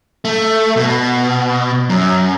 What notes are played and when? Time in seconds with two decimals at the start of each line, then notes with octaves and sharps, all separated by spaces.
0.25 A3
0.76 B2
1.89 F#2